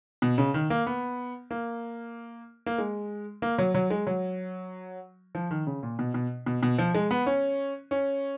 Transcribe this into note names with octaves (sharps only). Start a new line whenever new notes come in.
B2
C#3
D#3
A#3
B3
A#3
A#3
G#3
A#3
F#3
F#3
G#3
F#3
F3
D#3
C#3
A#2
B2
B2
B2
B2
F3
G#3
B3
C#4
C#4